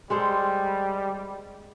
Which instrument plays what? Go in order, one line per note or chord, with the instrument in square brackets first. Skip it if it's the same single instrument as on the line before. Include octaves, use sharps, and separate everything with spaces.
[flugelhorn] G3 [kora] G#3 A4 C5